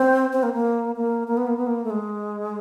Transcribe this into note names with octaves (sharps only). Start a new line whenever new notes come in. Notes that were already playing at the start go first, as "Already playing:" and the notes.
Already playing: C4
C4
A#3
A#3
A#3
A#3
B3
A#3
B3
A#3
A3
G#3